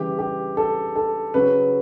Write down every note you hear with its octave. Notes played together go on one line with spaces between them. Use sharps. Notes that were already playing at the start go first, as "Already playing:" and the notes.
Already playing: C#3 E3 G3 G4
G4
A4
A4
C#3 F#3 B4